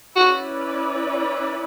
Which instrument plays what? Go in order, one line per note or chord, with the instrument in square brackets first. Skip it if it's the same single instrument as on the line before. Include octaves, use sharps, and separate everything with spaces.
[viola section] C#4 E4 B4 D5 [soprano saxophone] F#4